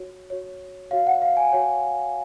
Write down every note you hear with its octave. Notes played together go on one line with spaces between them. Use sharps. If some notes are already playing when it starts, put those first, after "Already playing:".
Already playing: F#4 C#5
F#4 C#5
F#4 C#5 F5
F#5
F5
G#5
F#4 C#5